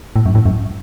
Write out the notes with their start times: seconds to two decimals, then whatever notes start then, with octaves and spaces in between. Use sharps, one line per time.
0.16 A2
0.26 F#2
0.35 A2
0.46 F#2